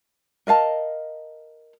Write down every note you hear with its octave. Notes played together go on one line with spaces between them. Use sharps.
A#4 D#5 F5 A5